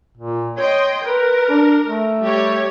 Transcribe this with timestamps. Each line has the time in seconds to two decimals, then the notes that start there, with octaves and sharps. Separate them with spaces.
0.17 A#2
0.58 C#5 D#5 G5 C6
1.04 A#4 B4
1.49 D4
1.86 A3
2.21 G3 G4 C#5